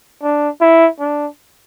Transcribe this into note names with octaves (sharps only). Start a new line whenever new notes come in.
D4
E4
D4